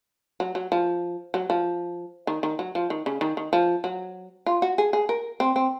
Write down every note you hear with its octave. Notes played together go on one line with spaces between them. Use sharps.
F#3
F#3
F3
F#3
F3
D#3
D#3
F#3
F3
D#3
C#3
D#3
D#3
F3
F#3
F4
F#4
G#4
G#4
A#4
C4
C4